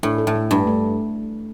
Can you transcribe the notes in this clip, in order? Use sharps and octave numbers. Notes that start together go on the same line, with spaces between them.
A2 D4
A4
A2
A3
G2 D4
A3